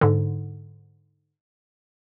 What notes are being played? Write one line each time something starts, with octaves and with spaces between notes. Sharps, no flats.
G#2 D3